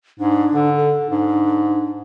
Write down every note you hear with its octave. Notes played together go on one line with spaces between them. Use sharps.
G#2 D4
D3
A4
G#2 D4